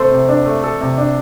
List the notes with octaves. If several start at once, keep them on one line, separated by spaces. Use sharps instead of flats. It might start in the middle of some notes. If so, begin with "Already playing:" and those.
Already playing: C3 A3 A4 C5
C3
D4
A3
A4
C3
D4